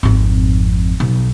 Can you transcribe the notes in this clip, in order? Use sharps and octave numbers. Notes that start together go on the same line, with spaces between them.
G#1 F2
B1